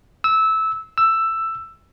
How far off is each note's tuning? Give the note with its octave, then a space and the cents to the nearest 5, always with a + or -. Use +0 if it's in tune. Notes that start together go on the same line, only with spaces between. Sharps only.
E6 -15
E6 +10